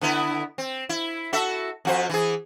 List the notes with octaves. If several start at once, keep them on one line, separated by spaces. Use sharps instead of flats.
D3 B3 E4
C4
E4
F#4 A4 E5
F2 F#4 C5
E3 G#4